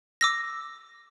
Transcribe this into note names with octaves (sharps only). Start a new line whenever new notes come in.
D6 E6 A#6